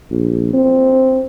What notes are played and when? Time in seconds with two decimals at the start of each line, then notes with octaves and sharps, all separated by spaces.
0.11 A#1
0.53 C4